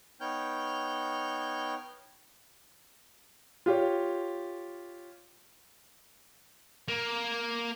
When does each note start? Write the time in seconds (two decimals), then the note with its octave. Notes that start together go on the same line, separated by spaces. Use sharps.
0.21 B3 D#4 C#5 G5 F6 G6
3.66 F4 G4 C#5
6.89 A#3